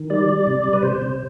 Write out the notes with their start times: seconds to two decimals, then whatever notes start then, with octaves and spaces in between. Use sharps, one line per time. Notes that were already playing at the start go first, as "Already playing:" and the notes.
Already playing: D#3
0.10 G3 D5
0.29 G3
0.47 C3
0.64 G3
0.73 B4
0.83 C3 C5
1.02 C3